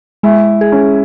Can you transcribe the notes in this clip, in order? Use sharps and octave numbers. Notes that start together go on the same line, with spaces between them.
G#3 E4
G#4
C#4